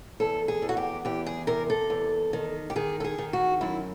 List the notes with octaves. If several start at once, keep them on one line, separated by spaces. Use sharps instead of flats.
E2 A4
G#4
E2
F#4
G4
E2 G4
G#4
C3 A#4
A4
E2
D#3
G4
D#3 G#4
A4
G#4
D#3
F#4
F#2 E4